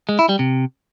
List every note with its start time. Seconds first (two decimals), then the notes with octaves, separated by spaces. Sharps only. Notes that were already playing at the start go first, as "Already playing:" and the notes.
0.09 G#3
0.19 E4
0.29 G3
0.39 C3